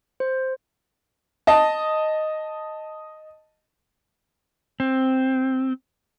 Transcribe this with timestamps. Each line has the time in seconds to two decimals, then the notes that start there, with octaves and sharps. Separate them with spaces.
0.20 C5
1.47 D#5 A5
4.80 C4